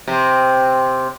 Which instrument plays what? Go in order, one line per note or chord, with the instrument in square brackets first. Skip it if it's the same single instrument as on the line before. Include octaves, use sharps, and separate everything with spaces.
[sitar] C3 C4